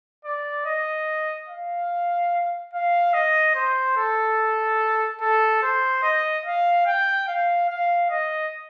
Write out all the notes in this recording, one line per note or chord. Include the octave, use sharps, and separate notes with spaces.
D5
D#5
F5
F5
D#5
C5
A4
A4
C5
D#5
F5
G5
F5
F5
D#5